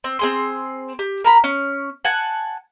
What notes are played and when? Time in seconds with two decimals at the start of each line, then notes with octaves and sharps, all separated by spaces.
0.04 C4
0.19 C4 G#4 C6
0.99 G4
1.24 A#4 A#5 B5
1.44 C#4
2.05 F#5 G#5 A5